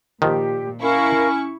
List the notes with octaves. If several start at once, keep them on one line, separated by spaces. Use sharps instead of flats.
A#2 D#3 F3 G4
C#4 E4 A#4 F5 C#6